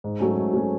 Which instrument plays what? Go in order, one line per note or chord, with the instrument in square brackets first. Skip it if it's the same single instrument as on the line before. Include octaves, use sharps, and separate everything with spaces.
[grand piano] G#2
F#3 A3 C#4
G#2
F#3 A3 C#4